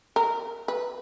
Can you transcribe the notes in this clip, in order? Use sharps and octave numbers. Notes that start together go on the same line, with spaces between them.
A#4
B4